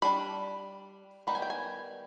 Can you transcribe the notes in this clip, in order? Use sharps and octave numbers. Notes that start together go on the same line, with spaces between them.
G3 D4 B5
D#3 G3 B3 D#4 B5
G#5
G5
G#5